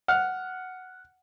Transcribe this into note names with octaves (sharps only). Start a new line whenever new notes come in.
F#5 F6